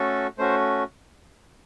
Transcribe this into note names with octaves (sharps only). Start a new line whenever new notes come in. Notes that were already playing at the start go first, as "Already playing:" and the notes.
Already playing: A3 C#4 F#4 A4
A3 C#4 F#4 C5